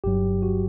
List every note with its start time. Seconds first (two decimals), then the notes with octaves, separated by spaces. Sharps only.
0.04 G1 G2 F#3 G4
0.42 F#4